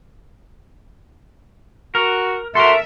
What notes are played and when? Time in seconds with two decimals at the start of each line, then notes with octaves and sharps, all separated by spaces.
1.95 F#4 A#4
2.55 D2 F#4 A4 A#4 E5 C6